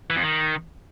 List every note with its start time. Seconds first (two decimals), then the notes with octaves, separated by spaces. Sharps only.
0.10 E3
0.16 F2
0.23 D#3